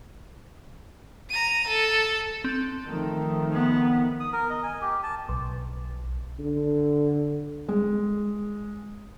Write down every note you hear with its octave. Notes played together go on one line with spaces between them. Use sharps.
A#5 D#7
A4
C4
D#3 F3 A3
B3
D#6
A#4
D#5
G#5
G4
A5
B1
D3
G#3